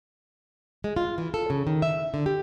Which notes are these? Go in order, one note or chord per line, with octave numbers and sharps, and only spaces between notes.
G#3
F4
E3
A4
C#3
D#3
E5
D3
G4